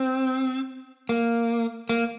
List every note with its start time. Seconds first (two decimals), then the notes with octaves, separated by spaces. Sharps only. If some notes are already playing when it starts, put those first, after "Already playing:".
Already playing: C4
1.09 A#3
1.89 A#3